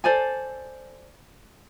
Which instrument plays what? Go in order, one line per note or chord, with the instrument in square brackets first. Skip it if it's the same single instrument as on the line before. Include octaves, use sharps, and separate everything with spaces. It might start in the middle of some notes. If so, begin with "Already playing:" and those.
[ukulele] A4 C5 D5 G#5